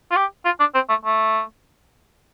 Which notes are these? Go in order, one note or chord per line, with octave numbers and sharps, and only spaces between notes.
F4
G4
F4
D4
C4
A3
A3